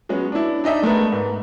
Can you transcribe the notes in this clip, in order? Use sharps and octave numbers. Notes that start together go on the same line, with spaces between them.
F#3 G#3 B3 C#4
D4 E4
D4 D#4 D#5 E5
G#3 A3 B3 A#4 B4
G#2